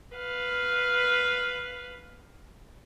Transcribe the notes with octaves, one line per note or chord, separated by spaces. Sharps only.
B4 F5